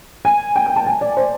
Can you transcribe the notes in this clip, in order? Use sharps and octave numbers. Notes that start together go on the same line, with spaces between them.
G#5
G5
G#5
A5
G#5
D5
C5